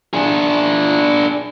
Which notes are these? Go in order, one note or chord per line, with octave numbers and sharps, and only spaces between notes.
D4 G#4